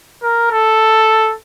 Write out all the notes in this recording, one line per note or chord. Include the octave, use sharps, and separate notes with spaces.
A#4
A4